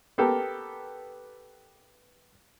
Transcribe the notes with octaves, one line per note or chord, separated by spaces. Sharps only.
B3 G4 A4 A#4